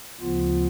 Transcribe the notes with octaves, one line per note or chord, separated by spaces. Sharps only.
D2 C#3 F3 B3 F4